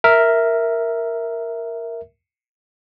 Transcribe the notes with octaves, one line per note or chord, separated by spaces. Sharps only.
A#4 E5